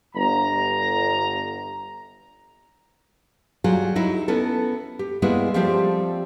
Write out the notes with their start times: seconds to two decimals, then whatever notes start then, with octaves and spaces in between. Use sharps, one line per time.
0.15 G1 A#5
3.64 F#3 G3 F4 G#4
3.96 F#3 D#4 E4
4.28 B3 C#4 E4 A4
4.99 G4
5.22 G3 G#3 A#3 B3 E4 G#4
5.54 F3 G3 A3 C4 G4